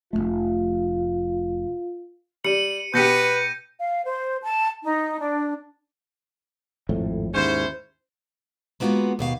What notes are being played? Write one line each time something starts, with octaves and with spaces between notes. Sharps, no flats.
F1 E2 A3 F4
G3 C#7 D#7 F#7
B2 G4 B4 G6 A#6 C#7 D#7
F5
C5
A5
D#4
D4
G#1 F2 A2
D#2 G#2 C#4 E4 C5
G#3 A#3 B3 D#4 F4 F#4
D#2 B2 F5